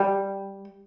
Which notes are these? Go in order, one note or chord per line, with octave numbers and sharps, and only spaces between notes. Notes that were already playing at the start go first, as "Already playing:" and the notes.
Already playing: G3